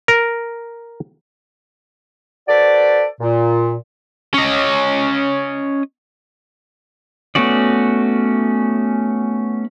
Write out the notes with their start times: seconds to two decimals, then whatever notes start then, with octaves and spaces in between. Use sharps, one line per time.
0.08 A#4
2.48 F#4 A4 B4 C5 D5
3.20 A#2
4.34 C#4 D#5
7.35 A3 B3 C#4 F#4 D5